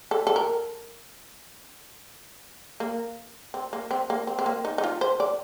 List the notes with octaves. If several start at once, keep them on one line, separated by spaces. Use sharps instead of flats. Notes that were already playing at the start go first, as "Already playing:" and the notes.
A4
A4
A#4
A#3
C4
A#3
C4
A#3
C4
C4
A#3
D#4
D#4
F4
C5
D5